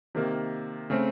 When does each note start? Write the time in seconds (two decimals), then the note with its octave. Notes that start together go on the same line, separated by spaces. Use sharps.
0.15 C3 D#3 A#3
0.90 C#3 A3 C4